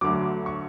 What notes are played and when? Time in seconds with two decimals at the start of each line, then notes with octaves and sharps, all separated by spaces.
0.01 D2 D3 F#3 D6
0.46 C#6